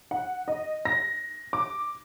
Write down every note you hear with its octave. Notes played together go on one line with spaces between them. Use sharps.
F#5
D#5
A#6
D6